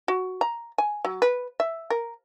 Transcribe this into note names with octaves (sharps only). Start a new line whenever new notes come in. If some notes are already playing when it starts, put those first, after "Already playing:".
F#4
A#5
G#5
F#3
B4
E5
A#4